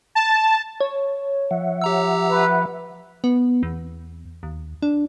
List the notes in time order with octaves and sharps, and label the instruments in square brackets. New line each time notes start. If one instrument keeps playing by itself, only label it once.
[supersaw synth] A5
[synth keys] C#5
[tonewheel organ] F3 E5 F#5
[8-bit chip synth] G4 A#5 E6
[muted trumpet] B4
[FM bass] B3
E2
D#2
D4